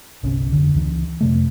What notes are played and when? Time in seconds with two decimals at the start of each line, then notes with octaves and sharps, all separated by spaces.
0.23 G1 C2 C3 C#4
0.52 F1 D3
0.75 C#2 E3
1.21 F2 C3 A3